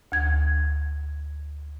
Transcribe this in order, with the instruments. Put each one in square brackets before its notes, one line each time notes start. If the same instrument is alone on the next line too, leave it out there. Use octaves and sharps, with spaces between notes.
[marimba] D2 G#6